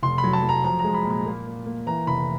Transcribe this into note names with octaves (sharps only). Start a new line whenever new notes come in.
F1 C6
B5
F#3
A5
F#3
A#5
F3 A#5
A#5
G#3
B5
A#2
B5
A#3
A#3
A#3
E3 A#5
F1 B5